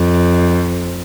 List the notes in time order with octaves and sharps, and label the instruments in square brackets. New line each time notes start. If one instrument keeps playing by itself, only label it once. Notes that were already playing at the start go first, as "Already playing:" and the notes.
Already playing: [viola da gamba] F2